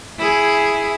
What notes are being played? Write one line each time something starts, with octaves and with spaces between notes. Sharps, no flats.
E4 G#4